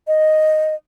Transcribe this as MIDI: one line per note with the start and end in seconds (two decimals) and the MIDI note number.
0.07 0.75 75